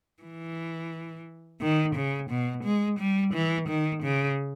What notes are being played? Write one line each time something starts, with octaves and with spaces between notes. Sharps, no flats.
E3
D#3
C#3
B2
G#3
G3
E3
D#3
C#3